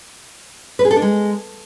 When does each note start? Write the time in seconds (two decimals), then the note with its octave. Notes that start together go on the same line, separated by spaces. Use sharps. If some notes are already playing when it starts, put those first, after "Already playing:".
0.79 B4
0.85 G#4
0.91 A4
0.96 D4
1.02 G#3